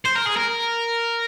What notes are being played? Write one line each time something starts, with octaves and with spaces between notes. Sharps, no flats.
C5
A#4
G#4
A#4